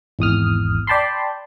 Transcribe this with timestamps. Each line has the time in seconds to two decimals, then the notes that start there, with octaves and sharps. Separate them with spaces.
0.19 G#1 E2 D#6 F6
0.87 D5 G5 A5 B5 C6